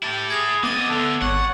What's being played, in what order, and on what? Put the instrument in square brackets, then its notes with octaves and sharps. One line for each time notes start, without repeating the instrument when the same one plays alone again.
[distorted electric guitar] E4 A4 [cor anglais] G4
[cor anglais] G#4 [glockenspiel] G#6 A#6 F7
[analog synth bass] B3 [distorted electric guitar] C4 D#5 [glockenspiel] D6 A6 D#7
[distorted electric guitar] D2 D3 [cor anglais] A4
[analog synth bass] G#1 [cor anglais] C#5 [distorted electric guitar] F#5